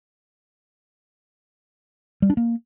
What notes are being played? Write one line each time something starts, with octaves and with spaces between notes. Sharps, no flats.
G3
D4
A#3